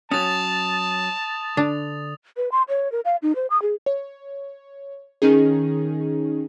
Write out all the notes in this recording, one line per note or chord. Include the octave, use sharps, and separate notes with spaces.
F#3 C#4 A5 D#6 A6 F7
D3 D4
B4
C6
C#5
A#4
F5
D#4
C5
D#6
G#4
C#5
D#3 C#4 D#4 G#4